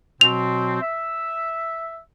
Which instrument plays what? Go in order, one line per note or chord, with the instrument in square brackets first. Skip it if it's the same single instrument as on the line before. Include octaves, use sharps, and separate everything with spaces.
[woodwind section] B2 F#3 C4 [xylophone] F7
[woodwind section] E5